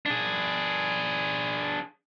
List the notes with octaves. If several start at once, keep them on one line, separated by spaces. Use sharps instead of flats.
D4 G#4